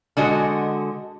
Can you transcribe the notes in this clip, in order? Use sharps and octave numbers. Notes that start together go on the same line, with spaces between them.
D3 G#3 F#4 D#5